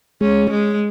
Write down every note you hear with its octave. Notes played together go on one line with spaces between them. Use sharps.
G#3 C#4
G#3